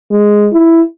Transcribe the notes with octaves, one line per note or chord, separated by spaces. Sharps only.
G#3
E4